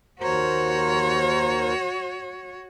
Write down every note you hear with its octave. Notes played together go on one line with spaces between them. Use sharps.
D#2 F#4 A#4 C5 C#5